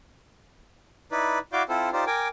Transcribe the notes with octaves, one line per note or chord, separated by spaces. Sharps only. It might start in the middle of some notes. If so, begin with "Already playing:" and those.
D#4 E4 B4 D5
E4 F#4 D5 F5 D6 G6
C4 E4 F4 A4 C5
D#4 F4 G4 C5 D5
A#4 G5 G#5 D6